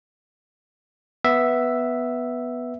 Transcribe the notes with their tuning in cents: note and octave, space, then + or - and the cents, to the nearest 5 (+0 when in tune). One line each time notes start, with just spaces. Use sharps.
B3 +0 E5 +0